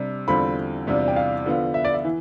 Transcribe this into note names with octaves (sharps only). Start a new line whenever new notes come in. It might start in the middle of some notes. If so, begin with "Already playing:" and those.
Already playing: C3 G3 D4
E2 D3 G3 C4 F4 B5
E2 C3 G3 D4 F4
G5
F5
D3 F3 B3 F4
E5
D5
E5
E3